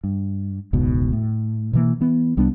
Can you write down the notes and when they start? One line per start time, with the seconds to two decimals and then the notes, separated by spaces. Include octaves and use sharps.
0.04 G2
0.73 E1 C#2 G#2 B2
1.13 A2
1.73 B2 E3 A#3
2.01 E3 B3
2.37 C2 G3 B3 D4